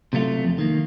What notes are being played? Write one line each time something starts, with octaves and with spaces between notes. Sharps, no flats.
C3 F#3 A3 F4
F2
D#3 A#3